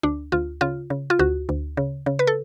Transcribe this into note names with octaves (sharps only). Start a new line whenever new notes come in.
D2 D4
D2 F4
C#3 F4
C#3
F4
D2 F#4
D2
C#3
C#3
B4
A4